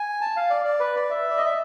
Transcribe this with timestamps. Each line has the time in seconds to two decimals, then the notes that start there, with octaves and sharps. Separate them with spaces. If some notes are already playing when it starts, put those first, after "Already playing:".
Already playing: G#5
0.21 A5
0.36 F5
0.50 D5
0.65 D5
0.80 B4
0.96 D5
1.10 E5
1.30 D5
1.37 D#5
1.46 E5